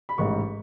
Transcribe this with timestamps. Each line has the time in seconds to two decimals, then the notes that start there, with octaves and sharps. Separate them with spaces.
0.09 B5
0.18 A1 G#2 D#3 C#6